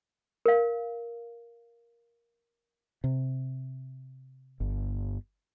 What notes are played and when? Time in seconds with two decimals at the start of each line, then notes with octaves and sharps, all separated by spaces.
0.46 A#4 F5
3.04 C3
4.60 G1